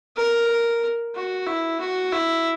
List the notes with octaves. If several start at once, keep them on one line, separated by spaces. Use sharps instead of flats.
A#4
F#4
E4
F#4
E4